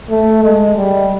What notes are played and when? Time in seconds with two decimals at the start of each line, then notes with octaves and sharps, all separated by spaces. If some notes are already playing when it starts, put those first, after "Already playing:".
0.10 A3
0.44 G#3
0.77 G3